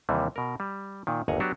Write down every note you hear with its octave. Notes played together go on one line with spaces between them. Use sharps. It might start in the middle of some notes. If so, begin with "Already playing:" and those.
D#2 C3 E3 G3
B2 A#4
G3
A#2 D#3
G1 D#2 F#5 G#5 A#5
F#3 B3 D4 F#4 G4